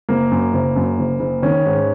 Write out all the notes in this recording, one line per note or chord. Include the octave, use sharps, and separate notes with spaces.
F#1 A#3
F#2
F#1
F#2
F#1
F#1
D#3 C#4
G#2